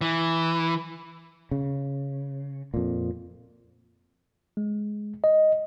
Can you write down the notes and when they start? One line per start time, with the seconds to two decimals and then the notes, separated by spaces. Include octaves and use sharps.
0.01 E3
1.51 C#3
2.74 F2 A#2
4.57 G#3
5.24 D#5